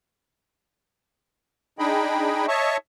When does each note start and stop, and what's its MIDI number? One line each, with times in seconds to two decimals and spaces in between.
1.79 2.46 62
1.79 2.46 63
1.79 2.46 68
1.79 2.46 75
1.79 2.46 79
1.79 2.46 83
2.48 2.77 73
2.48 2.77 75
2.48 2.77 76
2.48 2.77 81
2.48 2.77 85